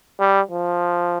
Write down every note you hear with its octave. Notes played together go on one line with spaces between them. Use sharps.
G3
F3